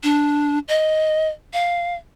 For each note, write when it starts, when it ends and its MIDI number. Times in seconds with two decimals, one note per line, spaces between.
0.03 0.59 62
0.68 1.28 75
1.53 1.95 77